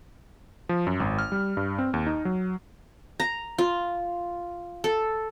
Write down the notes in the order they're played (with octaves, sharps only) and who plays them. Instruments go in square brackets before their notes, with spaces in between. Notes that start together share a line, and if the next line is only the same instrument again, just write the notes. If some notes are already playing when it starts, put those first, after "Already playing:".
[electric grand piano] F3
F#2
G#1
F6
G3
G2
C4
D#2
D#4
F#3
[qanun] A#5
F4
A4